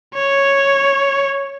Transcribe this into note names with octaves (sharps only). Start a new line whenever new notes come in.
C#5